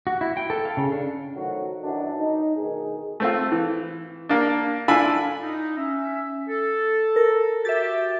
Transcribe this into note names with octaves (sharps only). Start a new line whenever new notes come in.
F#4
E4
G5
A4
F5
C#3
D4
D#3 F3 F#3 A3 F#4
F#2 D#3 E3 F#3 C#4 D4
D#4
D2 B2 D#3 G#4
A3 C4 F4
E3
A#3 D4
D4 E4 F4 A4 G#5 B5
D#4
C#4 E5
A4
A#4
F#4 G4 E5 A6